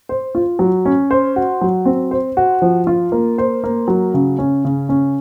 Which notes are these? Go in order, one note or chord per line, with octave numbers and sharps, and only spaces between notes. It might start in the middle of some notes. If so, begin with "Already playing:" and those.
C5
F4
F#3
C#4
C5
F#4
F#3
C4
C5
F#4
F3
F4
A#3
C5
A#3
F#3
C#3
C#4
C#3
C#4